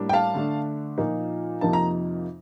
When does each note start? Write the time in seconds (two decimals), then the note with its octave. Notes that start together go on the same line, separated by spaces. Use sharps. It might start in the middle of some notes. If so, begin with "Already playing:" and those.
Already playing: A2 G3 A#3 D4
0.09 G5
0.13 F5 A5
0.35 D3 A3 D4
0.98 A#2 F3 A#3 D#4
1.61 F2 C3 F3 A#3 D#4 A5
1.73 A#5